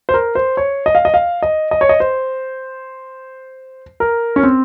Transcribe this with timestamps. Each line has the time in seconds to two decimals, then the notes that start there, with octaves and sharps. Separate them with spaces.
0.09 C5
0.14 A#4
0.35 C5
0.57 C#5
0.86 D#5
0.95 F5
1.05 D#5
1.14 F5
1.42 D#5
1.71 D#5
1.81 C#5
1.89 D#5
2.00 C5
4.00 A#4
4.36 C#4
4.43 C4